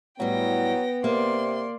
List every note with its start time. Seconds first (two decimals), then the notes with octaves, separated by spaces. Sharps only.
0.20 A2 F#3 G3 B3 G5 A#6
1.04 C3 A#3 D5 C6